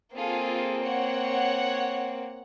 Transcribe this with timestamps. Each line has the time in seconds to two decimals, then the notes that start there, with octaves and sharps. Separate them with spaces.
0.16 A#3 C4 F4 G#4 A4
0.83 C#5 F#5